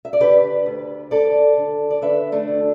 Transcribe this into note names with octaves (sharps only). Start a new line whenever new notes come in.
E5
D5
D3 G4 B4
D2
D2 A4 D5
D3
D5
D3 B4 E5
A3 D4
D2